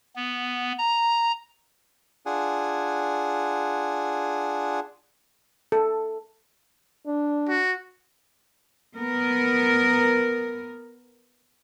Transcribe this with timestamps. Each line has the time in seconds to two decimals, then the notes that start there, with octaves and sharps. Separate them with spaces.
0.16 B3
0.78 A#5
2.26 D4 F4 G#4 F#5 G#5
5.72 A4
7.07 D4
7.49 F#4
8.96 B3 A#4